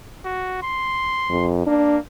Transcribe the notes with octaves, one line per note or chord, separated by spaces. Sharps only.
F#4
C6
F2
A#3 D4